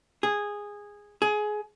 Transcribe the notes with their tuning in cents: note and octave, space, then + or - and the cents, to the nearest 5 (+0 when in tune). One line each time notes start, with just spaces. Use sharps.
G#4 -10
G#4 +20